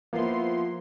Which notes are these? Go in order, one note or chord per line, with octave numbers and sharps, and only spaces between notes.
F3 A#3 B3 E4 C6